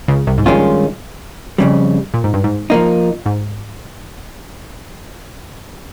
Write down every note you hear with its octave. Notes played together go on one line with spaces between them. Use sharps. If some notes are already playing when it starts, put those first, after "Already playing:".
C#2 C#3
C2 C3
G#2
A#1 G2 A#2 D#3 G#3 C#4 F4
F2 C#3 G3
A#2
G#2
G2
G#2
F3 A#3 D#4
G#2